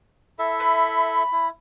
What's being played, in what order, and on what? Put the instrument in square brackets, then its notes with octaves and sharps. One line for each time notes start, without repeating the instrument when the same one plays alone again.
[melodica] E4 A4 E5
[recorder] B5
[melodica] E4